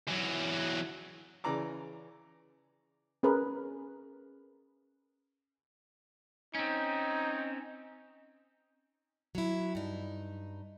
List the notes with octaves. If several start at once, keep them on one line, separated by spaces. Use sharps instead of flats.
E2 F#3
C#3 E3 D5 A#5 D6
C#4 G#4 A#4 B4
C4 C#4 D#4
F#3 E4
G2 D#4